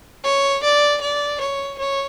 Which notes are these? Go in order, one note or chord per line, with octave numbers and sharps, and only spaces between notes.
C#5
D5
D5
C#5
C#5